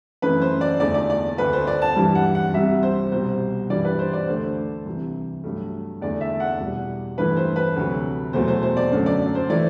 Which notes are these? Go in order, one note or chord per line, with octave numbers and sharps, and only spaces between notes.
F#2 E3 A3 B4
C5
D5
E2 D3 A3 D5
D5
D5
D2 D3 A3 B4
C5
D5
A5
G2 E3 G3
F#5
F#5
C2 C3 G3 E5
C5
C2 B2 G3 C5
G2 E3 G3 D5
B4
C5
D5
D2 D3 A3 C5
C2 C3 E3
G2 F#3 A3
E2 D3 A3 D5
E5
F#5
E2 B2 G3
G2 E3 A3 B4
C5
B4
D2 C3 F#3 A3
E2 B2 F#3 A3 C5
C5
C5
D5
F#2 D3 F#3 A3
D5
C5
E3 A3 D5